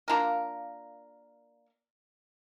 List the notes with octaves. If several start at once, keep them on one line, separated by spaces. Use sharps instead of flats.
A#3 D4 F4 A#4